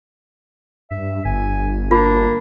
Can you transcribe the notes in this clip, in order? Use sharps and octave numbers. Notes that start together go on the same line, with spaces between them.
G2 E5
G1 G#5
A#3 D4 F4